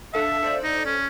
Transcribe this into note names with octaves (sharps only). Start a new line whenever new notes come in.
D4 A4 E5 F5
A4 C5 D5
D#4
C#4